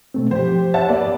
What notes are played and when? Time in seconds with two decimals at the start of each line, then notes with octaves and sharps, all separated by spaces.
0.14 B2 A3 C4
0.31 F3 G4 C5
0.74 C#5 E5 F#5 A5
0.88 A#3 B3 D5